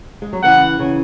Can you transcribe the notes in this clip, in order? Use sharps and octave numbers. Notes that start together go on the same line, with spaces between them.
G#3
F#3
C#3 E3 F#5
C#3 E3